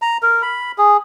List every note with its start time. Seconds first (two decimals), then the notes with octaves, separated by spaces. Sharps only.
0.02 A#5
0.23 A#4
0.42 B5
0.78 G#4